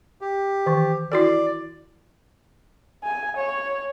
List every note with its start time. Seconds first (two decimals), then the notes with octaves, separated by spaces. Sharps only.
0.21 G4
0.66 D#3 E3
1.12 E4 F#4 A4 D5
3.04 G#5
3.37 C#5